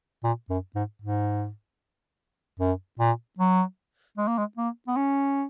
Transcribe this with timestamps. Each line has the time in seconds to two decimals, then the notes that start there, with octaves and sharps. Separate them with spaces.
0.24 A#2
0.50 F#2
0.75 G#2
1.02 G#2
2.60 F#2
2.99 A#2
3.39 F#3
4.18 G#3
4.27 A#3
4.38 G#3
4.57 A#3
4.88 B3
4.97 C#4